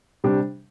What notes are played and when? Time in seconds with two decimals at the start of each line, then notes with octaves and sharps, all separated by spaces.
0.24 C3 G3 D4 G4